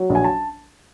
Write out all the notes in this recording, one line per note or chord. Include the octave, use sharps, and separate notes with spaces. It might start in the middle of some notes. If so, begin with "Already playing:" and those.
Already playing: F#3
A#1
G#5
A5